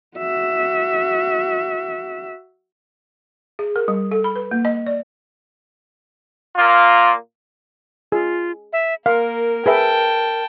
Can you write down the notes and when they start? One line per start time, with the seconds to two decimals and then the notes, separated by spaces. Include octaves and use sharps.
0.17 F#4 E5
3.59 G#4
3.76 A#4
3.88 G3
4.11 A4
4.24 B5
4.36 B4
4.51 A#3
4.65 D#5
4.87 D5
6.56 A#2 A#3 F4
8.12 F4 G#4
8.73 E5
9.06 A#3 A#4 F5
9.66 G#4 B4 E5 G5 A5